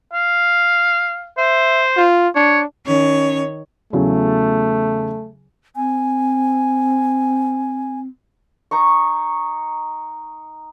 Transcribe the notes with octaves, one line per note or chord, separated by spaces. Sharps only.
F5
C5 E5
F4
D4 C#5
D#3 C#4 C#5
E2 C#3 F#3 A3
C4 G#5
D#4 A#5 C#6